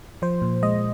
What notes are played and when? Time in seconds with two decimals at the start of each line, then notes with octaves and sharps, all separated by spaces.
0.22 F3 C5
0.42 A#2
0.62 G#3 D#5